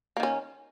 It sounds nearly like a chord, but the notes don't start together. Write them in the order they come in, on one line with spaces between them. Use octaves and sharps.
A#3 D#3 C#4